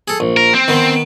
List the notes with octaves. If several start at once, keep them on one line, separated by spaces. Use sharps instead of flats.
G#4 A4
A#1
A#4
C4
D#3 B3